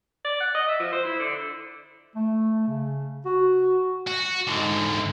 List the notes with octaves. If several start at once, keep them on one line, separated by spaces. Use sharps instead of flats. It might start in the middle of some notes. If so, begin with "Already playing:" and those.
D5
F#5
D#5
E5
F3
C5
E4
D3
A3
C#3
F#4
F#4
G#2 D3